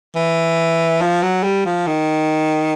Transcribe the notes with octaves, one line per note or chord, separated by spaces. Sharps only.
E3
F3
F#3
G3
F3
D#3